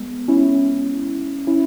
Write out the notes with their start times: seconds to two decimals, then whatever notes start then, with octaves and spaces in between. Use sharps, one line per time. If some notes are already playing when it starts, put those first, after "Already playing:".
Already playing: G#3 B3
0.28 C#4 E4
1.47 C#4 E4